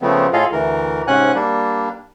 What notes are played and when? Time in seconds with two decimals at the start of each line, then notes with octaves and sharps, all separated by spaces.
0.02 C#3 F3 A3 B3 C4
0.33 A2 F4 G#4 A4 D#5 F5
0.52 D2 E3 A#4
1.07 G#2 C3 C#4 F#5 G#5 F#6
1.35 G3 A#3 D4